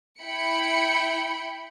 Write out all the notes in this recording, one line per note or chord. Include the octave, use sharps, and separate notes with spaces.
E4 G5 B5 C#7